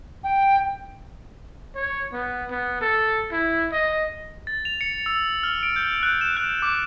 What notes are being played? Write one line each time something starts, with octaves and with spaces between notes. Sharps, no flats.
G5
C#5
B3
B3
A4
E4
D#5
A6
F7
C#7
E6
F6
D7
G6
F#6
E7
F#6
D6